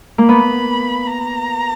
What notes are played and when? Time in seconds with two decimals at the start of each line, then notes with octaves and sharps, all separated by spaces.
0.18 A#3
0.29 B3 B5
1.07 A#5